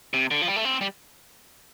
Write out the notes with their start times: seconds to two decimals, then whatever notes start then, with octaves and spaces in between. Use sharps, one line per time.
0.14 C3
0.31 D3
0.42 F3
0.48 G3
0.56 A3
0.65 C4
0.81 G3